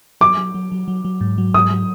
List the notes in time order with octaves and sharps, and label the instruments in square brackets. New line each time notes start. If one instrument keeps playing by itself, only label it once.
[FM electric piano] F#3 [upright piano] D6
[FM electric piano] F#3
F#3
F#3
F#3
F#3
G#2
F#3
[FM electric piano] G#2 [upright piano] D#6
[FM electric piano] F#3